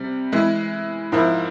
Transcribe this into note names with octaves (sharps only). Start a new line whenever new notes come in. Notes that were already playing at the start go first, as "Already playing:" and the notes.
Already playing: C3 G3
E3 G#3 E4
G#2 F3 A#3 E4